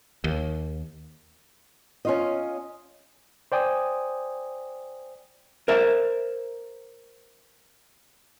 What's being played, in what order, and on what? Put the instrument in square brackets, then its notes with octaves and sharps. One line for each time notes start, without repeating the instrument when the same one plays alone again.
[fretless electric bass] D#2
[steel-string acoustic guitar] C#4 F4 D#5
[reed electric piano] C5 D5 G5 G#5 D#6
[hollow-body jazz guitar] A#4 C5 E5